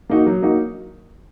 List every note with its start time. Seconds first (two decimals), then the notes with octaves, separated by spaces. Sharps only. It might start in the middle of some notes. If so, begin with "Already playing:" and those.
0.10 A#3 D#4 F#4
0.26 F#3
0.42 A#3 D#4 F#4